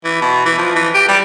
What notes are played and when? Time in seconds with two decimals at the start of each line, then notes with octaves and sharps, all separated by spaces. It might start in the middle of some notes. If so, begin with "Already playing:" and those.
0.04 E3
0.22 B2
0.46 E3
0.58 F3
0.75 E3
0.94 G4
1.08 G3